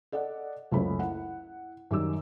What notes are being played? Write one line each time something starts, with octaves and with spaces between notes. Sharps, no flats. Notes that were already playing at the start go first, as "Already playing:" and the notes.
A4 D5 D#5 F#5
F#1 C#2 F#2 A3 C#5 B5
E4 F#5
F#2 D#3 G3 D6 E6